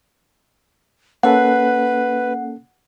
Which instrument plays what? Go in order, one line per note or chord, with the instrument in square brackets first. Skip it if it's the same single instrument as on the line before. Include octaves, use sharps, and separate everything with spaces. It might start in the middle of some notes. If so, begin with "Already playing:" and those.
[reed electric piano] A#3 C#4 A4 [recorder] B4 [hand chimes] F#5